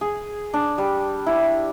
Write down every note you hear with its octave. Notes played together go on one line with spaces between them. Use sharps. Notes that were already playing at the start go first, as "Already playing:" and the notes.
G#4
D4
G3
E4